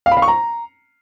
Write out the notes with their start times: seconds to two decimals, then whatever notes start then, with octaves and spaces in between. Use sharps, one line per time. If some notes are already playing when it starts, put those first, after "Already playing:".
0.06 F5
0.11 B5
0.17 F5
0.22 C#6
0.28 A#5